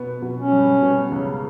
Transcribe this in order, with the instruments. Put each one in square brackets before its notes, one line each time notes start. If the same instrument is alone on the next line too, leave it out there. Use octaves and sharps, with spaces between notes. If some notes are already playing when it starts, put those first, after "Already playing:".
Already playing: [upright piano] B2 B3
B2 B3
[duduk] C#4
[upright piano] G2 G3
B2 B3
C#2 C#3